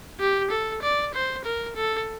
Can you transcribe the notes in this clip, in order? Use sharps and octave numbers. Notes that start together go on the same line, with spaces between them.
G4
A4
D5
C5
A#4
A4